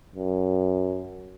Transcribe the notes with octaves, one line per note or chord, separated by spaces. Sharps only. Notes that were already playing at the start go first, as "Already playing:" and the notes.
F#2